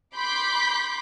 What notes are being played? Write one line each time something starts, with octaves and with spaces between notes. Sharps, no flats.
B5 C6 D6 G6 B6